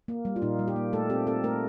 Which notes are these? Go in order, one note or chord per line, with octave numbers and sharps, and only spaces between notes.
A#3
G3
F4
A#2 D#4
G3
G4
A#3
A3 A4
C4 G4
C4 A4
A3 A#4